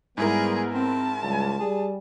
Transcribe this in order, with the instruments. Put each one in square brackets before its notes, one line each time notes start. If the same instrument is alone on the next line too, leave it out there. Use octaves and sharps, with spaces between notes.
[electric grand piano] G#2 E4 A#4 [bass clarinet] G3 [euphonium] B3 [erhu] G#4
[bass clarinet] C4 [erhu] A5
[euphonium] C#2 [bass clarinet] G3
[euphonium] G3 [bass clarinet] G#4